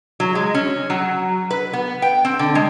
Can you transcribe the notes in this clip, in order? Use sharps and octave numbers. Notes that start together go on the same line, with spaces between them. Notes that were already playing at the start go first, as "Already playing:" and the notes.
F#3
G#3
C#4
F#3
B4
B3
G5
C4
D3
G#3